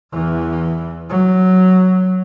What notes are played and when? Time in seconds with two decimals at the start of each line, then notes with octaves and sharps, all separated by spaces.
0.13 E2 E3
1.10 F#3